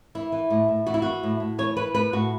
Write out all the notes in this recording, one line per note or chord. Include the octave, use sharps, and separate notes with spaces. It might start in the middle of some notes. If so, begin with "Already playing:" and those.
E3 E4
E3
A2
A2
E3 F#4
E4
E3 F#4
A2
A2
E3 C#5
E3 B4
A2 B4
A2 F#4